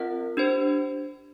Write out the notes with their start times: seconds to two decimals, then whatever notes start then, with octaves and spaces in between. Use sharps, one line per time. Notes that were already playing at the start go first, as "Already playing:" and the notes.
Already playing: C4 F4 A#4 D#5 F#5
0.37 D4 G4 C5